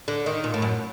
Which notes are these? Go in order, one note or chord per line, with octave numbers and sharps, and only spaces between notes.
D3
D#3
A#2
A2
F#2